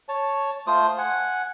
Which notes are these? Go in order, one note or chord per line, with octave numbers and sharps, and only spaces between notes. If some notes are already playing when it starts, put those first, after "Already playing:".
C#5 A5
A3 F4 C5 D#6
F#5 G#5